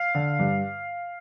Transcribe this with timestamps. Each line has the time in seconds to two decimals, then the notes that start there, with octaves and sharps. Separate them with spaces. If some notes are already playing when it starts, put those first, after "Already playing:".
Already playing: F5
0.15 D3
0.39 G2